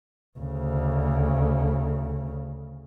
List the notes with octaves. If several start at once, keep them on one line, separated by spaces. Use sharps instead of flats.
D2 C#3